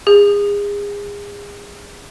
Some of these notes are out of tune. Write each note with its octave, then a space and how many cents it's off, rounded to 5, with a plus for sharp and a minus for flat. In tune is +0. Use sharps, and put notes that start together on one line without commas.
G#4 -30